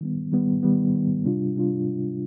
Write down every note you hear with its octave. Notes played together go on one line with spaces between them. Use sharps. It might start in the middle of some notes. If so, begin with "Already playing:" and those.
D#3 G3 B3
D#3 G3 B3
D#3 G3 B3
D#3 G3 B3
C3 G3 D4 F4
C3 G3 D4 F4